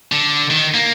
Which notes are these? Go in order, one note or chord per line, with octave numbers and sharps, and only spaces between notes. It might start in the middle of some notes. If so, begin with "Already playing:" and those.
D3
D#3
A#3